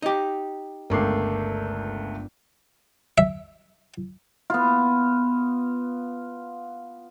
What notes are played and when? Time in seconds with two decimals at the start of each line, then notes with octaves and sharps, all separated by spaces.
0.02 D#4 G4
0.90 G1 C#2 A3 A#3 D6 C7
3.18 E5
4.50 B3 F4